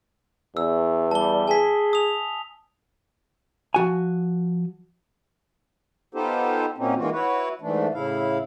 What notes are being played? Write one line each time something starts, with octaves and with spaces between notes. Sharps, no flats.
E2 E6
G3 A5 G7
G#4 G#5 A5 B6
D#6 F7
F3 F#4 G#5
B3 D#4 F4 G4 A4 C5
A#2 F#3 A#3 C4 C#4 D#4
D#3 E3 G#3 A#3 F4 F#4
E4 F#4 B4 C#5
G#2 E3 A3 D4
A2 C#3 E4 F5